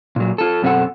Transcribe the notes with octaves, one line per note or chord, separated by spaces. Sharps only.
A#2 F#3
F4 A4
F#2 B2 C4 F#4 A4 F#5